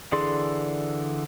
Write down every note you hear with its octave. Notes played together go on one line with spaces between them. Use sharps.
D3 E3 G#4 D5 C6